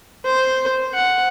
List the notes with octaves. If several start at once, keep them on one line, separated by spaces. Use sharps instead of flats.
C5
F#5